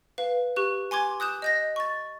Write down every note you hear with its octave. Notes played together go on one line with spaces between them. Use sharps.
B4 F5
G4 C#6 F#6
G#5 C6 D6 G#6
D#6 F#6 G6 E7
D#5 G6 A#6
C#6 A6